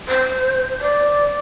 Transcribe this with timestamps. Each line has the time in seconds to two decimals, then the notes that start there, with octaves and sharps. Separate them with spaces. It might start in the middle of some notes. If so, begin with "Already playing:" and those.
0.09 C5
0.81 D5